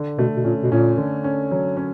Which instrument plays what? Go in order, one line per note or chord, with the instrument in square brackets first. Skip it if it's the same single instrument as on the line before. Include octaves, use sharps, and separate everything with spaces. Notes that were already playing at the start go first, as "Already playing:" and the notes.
Already playing: [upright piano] D3
[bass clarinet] B2 [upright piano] A3
[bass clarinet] B2
[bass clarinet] A#2 [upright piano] C#4
[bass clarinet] B2
[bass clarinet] A#2 [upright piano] C#4
[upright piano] D3
C#4
F#3
C#4